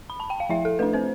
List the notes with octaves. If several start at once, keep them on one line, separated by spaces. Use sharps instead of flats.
B5
A5
G5
F5
F3 E4 E5
A4
A3 D4 B4
C4 C5